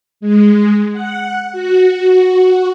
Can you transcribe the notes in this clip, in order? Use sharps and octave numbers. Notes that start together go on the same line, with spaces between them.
G#3
F#5
F#4